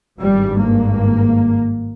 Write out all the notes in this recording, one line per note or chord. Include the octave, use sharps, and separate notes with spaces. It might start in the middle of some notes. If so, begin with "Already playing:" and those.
G#1 G2 G3
A#3